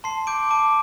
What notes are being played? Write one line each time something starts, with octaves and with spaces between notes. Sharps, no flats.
A5 C6 C7
D6 G6 D7
A5 D6 D7